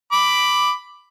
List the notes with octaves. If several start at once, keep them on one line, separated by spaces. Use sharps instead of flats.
B5 D6